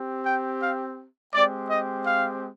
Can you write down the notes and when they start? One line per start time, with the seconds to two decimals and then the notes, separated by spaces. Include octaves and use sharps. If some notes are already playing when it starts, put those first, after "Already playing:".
Already playing: C4 G4
0.26 G5
0.62 F5
1.33 G#3 C4 G4 D5
1.70 D#5
2.06 F5